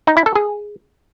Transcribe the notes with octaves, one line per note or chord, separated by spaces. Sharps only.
D#4
E4
A4
G#4